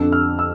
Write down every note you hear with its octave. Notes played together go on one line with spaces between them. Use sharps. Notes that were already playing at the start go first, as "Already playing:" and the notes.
Already playing: F2 D3 E6
F6
E6